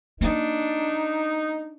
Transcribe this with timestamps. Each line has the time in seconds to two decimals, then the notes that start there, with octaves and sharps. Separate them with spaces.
0.21 A#3 D4 D#4